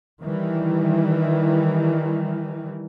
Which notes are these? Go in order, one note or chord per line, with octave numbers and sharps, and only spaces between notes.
D#3 E3 G3